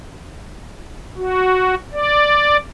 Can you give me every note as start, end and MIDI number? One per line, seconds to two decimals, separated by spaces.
1.17 1.75 66
1.93 2.57 74